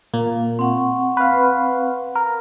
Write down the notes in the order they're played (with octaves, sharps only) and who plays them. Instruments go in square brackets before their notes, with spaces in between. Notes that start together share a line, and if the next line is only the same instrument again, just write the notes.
[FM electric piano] A#2 A#3
[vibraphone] C4 F#5 C#6
[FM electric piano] B4 F5
A#4